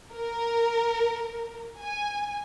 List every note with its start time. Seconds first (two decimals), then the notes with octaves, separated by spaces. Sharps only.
0.15 A#4
1.81 G#5